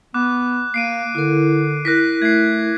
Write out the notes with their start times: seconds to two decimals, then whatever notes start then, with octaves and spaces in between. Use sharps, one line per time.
0.14 B3 D6 F#6
0.74 A#3 C7 D7 D#7
1.15 D3 E4 A#4
1.85 E4 A#4 F#6 A#6 B6
2.22 A3 G#6 C7